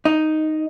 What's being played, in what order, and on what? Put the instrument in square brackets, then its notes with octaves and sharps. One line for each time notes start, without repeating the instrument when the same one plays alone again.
[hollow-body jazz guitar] D#4